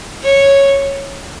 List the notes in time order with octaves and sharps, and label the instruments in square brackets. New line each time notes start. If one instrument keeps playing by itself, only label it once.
[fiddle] C#5